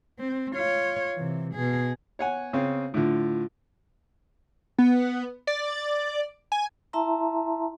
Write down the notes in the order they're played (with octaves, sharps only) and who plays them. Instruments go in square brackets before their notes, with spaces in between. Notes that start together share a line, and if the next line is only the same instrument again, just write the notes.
[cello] C4
F4 C#5
C3 E3
B2 G#4
[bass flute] B3 [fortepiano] C#5 F#5 G#5
[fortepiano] C#3 C4 C#4
[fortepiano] A2 D3 [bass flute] F4
[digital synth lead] B3
D5
G#5
[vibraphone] E4 E5 A5 A#5 C6